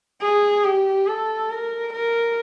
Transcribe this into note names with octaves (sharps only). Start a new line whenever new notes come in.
G#4
G4
A4
A#4
A#4